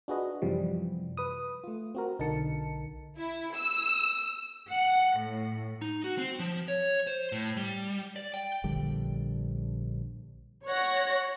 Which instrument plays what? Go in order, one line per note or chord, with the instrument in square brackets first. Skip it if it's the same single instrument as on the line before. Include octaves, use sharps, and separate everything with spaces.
[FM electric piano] D4 F4 F#4 G#4 B4 D#5
F#2 C3 E3 F3 G3
B4 D#6
A3 F4
C4 F#4 A#4
B1 D3 D#4 A#4 A5 C#7
[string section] E4
E6
F#5
A2
[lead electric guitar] D#4
F#4
C4
F3
C#5
C5
A2
G3
D5
G5
[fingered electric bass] A#1 D3 G3
[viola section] C#5 [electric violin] F#5 A#6